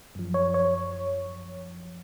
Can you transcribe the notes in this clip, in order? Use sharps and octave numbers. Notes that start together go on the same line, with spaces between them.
F#2 F3
C#5
C#5